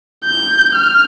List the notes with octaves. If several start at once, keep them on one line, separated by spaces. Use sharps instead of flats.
G6
F6